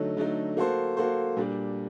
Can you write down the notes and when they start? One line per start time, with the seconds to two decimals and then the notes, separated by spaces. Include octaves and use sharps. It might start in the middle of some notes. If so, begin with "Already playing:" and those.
Already playing: D3 F#3 A3 D#4
0.17 D3 F#3 A3 D#4
0.57 A#3 F#4 A4 C5
0.97 A#3 F#4 A4 C5
1.37 A#2 G3 D4